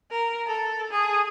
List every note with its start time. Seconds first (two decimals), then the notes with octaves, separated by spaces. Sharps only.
0.11 A#4
0.47 A4
0.91 G#4